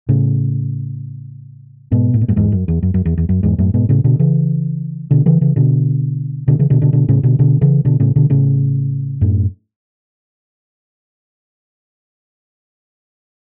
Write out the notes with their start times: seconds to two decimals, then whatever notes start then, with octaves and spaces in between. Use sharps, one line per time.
0.09 A2 C#3
1.92 G#2 B2
2.14 A2
2.21 B2
2.28 F#2 A2
2.36 E2 G#2
2.52 F#2
2.68 E2
2.83 F#2
2.94 F#2
3.05 E2
3.17 E2
3.29 F#2
3.43 E2 G#2
3.58 F#2 A2
3.74 G#2 B2
3.89 A2 C#3
4.04 B2 D3
4.19 C#3 E3
5.11 B2 D3
5.26 C#3 E3
5.41 C#3 E3
5.56 B2 D3
6.48 B2 D3
6.59 C#3 E3
6.70 B2 D3
6.82 B2 D3
6.93 B2 D3
7.09 A2 C#3
7.23 B2 D3
7.39 B2 D3
7.61 C#3 E3
7.85 B2 D3
8.00 A2 C#3
8.16 B2 D3
8.30 A2 C#3
9.21 F#2 A2